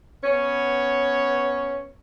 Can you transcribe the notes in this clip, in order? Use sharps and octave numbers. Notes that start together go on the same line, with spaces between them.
B3 C#4 C#5